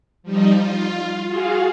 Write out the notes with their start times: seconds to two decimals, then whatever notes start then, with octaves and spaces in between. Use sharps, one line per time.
0.23 F3 G3 D#4
0.55 F4
1.25 F4 F#4 G#4 F5